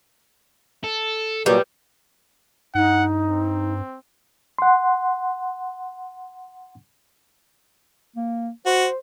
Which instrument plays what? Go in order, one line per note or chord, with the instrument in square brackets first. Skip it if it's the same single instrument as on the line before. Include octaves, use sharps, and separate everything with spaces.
[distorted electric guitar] A4
[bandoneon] A#2 F#3 [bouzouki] G3 [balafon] B4 D6
[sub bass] G2 [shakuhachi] D#4 [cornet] F#5
[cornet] C4
[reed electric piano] F#5 C6
[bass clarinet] A#3
[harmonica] F#4 [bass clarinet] C5